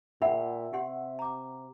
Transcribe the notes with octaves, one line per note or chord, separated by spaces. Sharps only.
A#2 E5 F#5 G5 B5
C3 G4 F#5 C6
A#5 D6